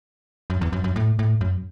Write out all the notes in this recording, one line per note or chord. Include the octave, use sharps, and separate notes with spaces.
F#2
E2
F#2
F#2
A2
A2
F#2